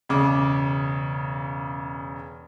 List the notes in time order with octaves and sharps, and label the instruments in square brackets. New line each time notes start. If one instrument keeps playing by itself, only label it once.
[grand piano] E1 C#3 D6